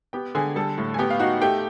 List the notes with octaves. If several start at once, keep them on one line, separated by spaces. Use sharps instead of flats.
B3 G4 G5
D3 G#4 G#5
G3 A4 A5
A2
G#5
B3 G4 G5
F5
D#4 F#4 F#5
A3 G4 G5